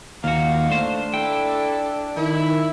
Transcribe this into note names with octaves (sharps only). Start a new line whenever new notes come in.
D#2 A#3 F4 F#4 F5
A3 D4 C5
E4 A4 G5
D#3 E4